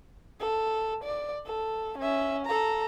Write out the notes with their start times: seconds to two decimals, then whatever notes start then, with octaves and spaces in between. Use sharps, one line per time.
0.40 A4
1.04 D5
1.47 A4
1.98 C#4 E5
2.46 A4 A#5